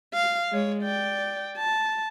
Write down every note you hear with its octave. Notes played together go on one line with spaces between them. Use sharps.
F5
G#3 C#5
D5 G5
A5